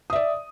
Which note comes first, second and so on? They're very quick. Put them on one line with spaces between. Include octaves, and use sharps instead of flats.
D#6 E5 D5